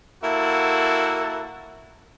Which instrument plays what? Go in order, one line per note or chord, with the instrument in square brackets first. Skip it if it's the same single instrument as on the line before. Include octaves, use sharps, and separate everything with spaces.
[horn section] A#3 E4 F#4 A4